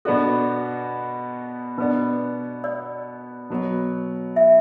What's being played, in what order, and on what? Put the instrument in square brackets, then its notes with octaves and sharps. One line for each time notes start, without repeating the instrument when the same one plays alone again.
[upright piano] B2 B3 D4 F#4 [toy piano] A4
[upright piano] B2 B3 D4 [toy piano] B4
[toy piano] D5
[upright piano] B2 F#3 B3
[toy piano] E5